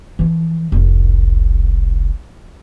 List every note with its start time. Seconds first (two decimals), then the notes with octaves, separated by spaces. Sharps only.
0.19 E3 F3
0.72 F1 C2